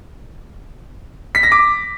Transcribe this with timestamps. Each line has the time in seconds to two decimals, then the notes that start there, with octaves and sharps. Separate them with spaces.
1.35 B6
1.43 A#6
1.52 D6